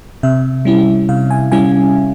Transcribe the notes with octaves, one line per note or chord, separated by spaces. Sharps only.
C3 E5
G3 C#4 E4
C3 F5
G#5
G3 C#4 E4 G#5